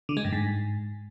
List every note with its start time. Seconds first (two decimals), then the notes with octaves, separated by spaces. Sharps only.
0.09 D3
0.17 G#3
0.25 G2
0.32 G#2